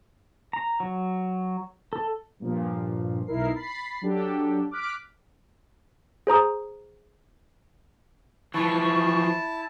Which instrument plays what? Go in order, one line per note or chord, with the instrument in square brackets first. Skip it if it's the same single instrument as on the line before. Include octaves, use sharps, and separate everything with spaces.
[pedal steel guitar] A#5
F#3
A4
[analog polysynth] G2 A#2 F3
B1 D#4 E4 A#4 C7
B5 A6 C7
F#3 D4 G4 A4
D6 F6 F#6 B6 D7
[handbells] G#4 C5 A#5 D#6
[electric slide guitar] E3 F3 [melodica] E4 A5 [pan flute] C#6